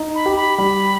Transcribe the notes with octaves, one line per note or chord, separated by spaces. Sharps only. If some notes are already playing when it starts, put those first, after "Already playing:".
Already playing: D#4
B5
G4
B5
G3 B5